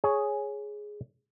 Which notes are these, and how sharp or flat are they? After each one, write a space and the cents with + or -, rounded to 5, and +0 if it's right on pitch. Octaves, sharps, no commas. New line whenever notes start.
G#4 +5 C#5 +0